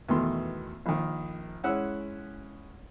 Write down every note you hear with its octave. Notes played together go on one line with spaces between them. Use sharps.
E2 B2 D#3 A3 C6
A#1 D#3
G#3 C#4 E4 F#5 E6 F#6